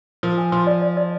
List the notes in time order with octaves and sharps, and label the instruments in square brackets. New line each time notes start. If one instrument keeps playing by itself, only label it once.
[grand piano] F3 [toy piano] A#4
[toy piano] G#5
[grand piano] F3 [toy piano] C6
[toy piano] D5
D5
D5